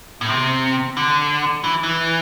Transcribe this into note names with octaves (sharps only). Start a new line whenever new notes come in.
A2
C3
D3
E3
E3